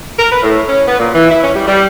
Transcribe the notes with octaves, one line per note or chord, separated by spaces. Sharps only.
A#4
B4
A2
C#4
B3
A#2
E3
E4
C#4
G3
G3